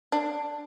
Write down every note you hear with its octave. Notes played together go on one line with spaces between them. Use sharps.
D4